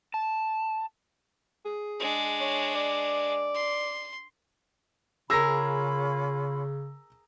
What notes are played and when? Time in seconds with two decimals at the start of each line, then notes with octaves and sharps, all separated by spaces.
0.14 A5
1.65 G#4
2.00 G#3 D4
2.40 C#5
2.74 D5
3.54 C6
5.30 C#3 C#4 F4 G#4 A#4 B5 E6 A#6